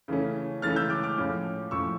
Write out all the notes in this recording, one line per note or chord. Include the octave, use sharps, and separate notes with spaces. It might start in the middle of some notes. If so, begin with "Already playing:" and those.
C#3 E3 A3 C#4
C#3 E3 A3 C#4 F6 A6
E6 G6
D6 F6
D6 F6
A2 F3 C#4
A2 F3 C#4 C#6 E6